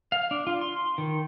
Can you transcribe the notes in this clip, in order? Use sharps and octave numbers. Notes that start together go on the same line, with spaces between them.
F5
D4
F4
C6
D#3